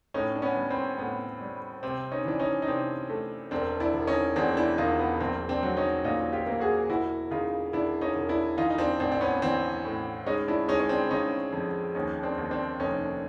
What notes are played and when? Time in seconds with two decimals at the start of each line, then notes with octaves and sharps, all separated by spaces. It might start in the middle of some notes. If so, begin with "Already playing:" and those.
0.14 A2 C#4 D#4
0.35 D4
0.42 B3 C#4
0.57 G3
0.70 C4
0.99 A2 B3
1.41 G3
1.83 C3 C4
2.11 C#4 D#4
2.25 E3 D4
2.39 C#4 D#4
2.62 D#4
2.67 C3 C4 D4
3.10 A3
3.51 E1 C4 D4
3.80 D4 E4
3.94 E1
4.07 C#4 D#4
4.36 E2 C4 D4
4.57 D4 E4
4.78 E1 D#4 F4
4.99 B3
5.20 A#1 C4
5.49 C4 D4
5.63 F#3
5.77 C#4 D#4
6.04 A#2 D#4 F4
6.33 F4 G4
6.47 A#3
6.60 F#4 G#4
6.89 E1 E4 F#4
7.31 C#3 D#4 F4
7.73 E1 D4 E4
8.01 C#4 D#4
8.15 E1
8.29 D4 E4
8.57 E3 D#4 F4
8.70 D#4
8.78 C4 D4
9.00 A1 C4 D4
9.12 D4
9.21 B3 C#4
9.42 E3 C4 D4
9.85 A2
10.26 G#3 C#4 D#4
10.48 D4 E4
10.68 G#3 C#4 D#4
10.80 C#4
10.89 C4 D4
11.10 C#3 C#4 D#4
11.53 F2
11.95 D#2 C#4 D#4
12.23 C4 D4
12.38 D#2
12.51 C4 D4
12.79 F1 C#4 D#4